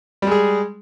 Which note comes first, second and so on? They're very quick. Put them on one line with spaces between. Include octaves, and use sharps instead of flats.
G3 G#3 G#4